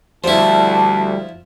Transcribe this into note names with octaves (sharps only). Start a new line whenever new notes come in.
D2 F3 G3 E4 C5 A5